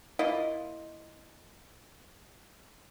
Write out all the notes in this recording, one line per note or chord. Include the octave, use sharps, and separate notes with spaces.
A#3 E4 F4 D#5